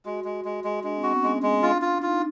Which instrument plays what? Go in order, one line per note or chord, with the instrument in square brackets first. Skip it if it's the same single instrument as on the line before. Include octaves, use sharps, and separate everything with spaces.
[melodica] G#3 [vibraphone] F#4
[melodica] G#3
G#3
G#3
[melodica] G#3 [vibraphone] D4
[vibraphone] C4
[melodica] F#4
[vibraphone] B3
[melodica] G#3 [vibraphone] C#4
[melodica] G#3
[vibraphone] D4 [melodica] F4
[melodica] F4
[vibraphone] D4
[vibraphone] D#4 [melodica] F4